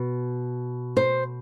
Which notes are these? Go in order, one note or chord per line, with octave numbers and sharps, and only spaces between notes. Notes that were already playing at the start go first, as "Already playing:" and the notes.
Already playing: B2
C5